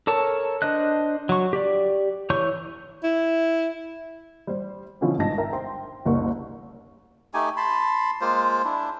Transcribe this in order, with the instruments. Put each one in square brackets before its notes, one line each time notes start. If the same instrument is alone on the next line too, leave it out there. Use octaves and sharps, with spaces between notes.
[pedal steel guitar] A4 A#4 C#5 A5
D4 C5 D#5 F#6
F#3 C#6
G4 D5
E3 C#5 C#6 G6
[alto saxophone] E4
[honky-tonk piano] G3 C5
B2 D3 F3 C#4 E4 F4
G#1 G2 B2 D#4 A5 A#6
A#4 E5 G5 A#5
C5 G5 C6
F#1 C2 A#3 D4 C#6
[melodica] A3 D#4 G4 G#5
A5 B5 C6
G#3 A#3 F4 C5
D4 E4